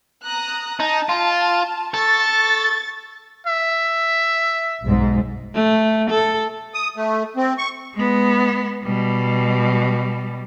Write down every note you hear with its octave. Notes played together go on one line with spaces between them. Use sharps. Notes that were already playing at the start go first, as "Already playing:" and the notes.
A#5 D#6 F#6
D#4 A5
F4
A4 C#6 A6
E5
B1 G#2
A3
A4
D#6
A3
C4
C#6
G#3 B3
B2 G3